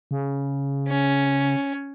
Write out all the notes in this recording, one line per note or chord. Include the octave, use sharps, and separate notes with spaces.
C#3
C#4